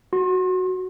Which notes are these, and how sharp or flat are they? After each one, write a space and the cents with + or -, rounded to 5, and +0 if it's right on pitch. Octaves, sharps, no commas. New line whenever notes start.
F#4 +0 C6 +40